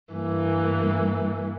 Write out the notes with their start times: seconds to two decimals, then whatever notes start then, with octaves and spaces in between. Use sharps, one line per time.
0.13 G2 E3 A#3